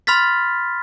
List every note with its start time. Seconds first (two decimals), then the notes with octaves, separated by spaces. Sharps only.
0.07 B5 C6 F6 A6 B6